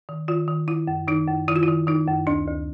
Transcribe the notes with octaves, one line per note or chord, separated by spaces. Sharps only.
D#3
D#3 F4
D#3
D#3 E4
F#2
D#3 D#4
F#2
D#3 E4
F4
E4
D#3
D#3 D#4
F#2
D2 D4
D2